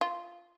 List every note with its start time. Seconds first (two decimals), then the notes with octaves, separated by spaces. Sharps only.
0.01 F4